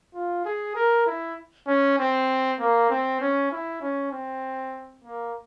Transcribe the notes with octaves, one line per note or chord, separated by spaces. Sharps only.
F4
G#4
A#4
E4
C#4
C4
A#3
C4
C#4
E4
C#4
C4
A#3